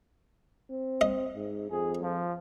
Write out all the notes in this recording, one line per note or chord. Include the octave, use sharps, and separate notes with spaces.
C4
D#5
G#2
F2 G#4
F3